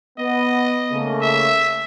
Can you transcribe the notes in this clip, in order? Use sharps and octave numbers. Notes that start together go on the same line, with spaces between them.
B3 D#5
C#3 A3 A#3
E5